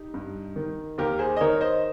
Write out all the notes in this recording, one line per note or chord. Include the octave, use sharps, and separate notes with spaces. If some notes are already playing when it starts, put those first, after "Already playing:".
Already playing: D#4 G4
G2
D#3
D#2 G4 A#4
G#4 C5
D#5
D#3 A#4 C#5
C5 D#5